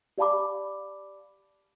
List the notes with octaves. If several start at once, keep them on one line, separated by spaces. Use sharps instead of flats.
G4 D5 F5 A5 B5 D6